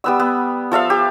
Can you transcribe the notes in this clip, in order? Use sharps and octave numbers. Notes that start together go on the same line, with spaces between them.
G3 B3 E6
B3
F3 A4 E5 F5
G4